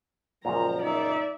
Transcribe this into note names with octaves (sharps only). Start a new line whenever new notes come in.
C#2 F#2 A#2 F3 A#5
D#4 D5 E5